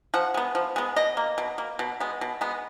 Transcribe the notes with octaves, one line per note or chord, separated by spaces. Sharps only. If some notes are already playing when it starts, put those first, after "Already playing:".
F3 F#5
G#3 B3
F3
G#3 B3
B2 D#5
A#3
B2
A#3
B2
G#3 B3
B2
G#3 B3